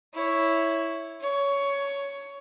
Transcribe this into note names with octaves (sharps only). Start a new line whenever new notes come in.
E4 C#5
C#5